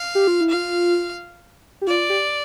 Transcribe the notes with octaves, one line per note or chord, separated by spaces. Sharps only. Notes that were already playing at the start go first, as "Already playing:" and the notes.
Already playing: F5
G4
F4
E4
F4 F5
G4
F4 D5
G4